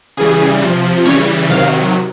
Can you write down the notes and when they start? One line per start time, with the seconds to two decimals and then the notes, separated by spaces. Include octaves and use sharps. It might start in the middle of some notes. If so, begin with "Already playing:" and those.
0.17 C#3 E3 G3 G#4
0.61 C3 F3
1.05 C#3 E3 G3 C#5
1.49 C3 D#3 F#3 F5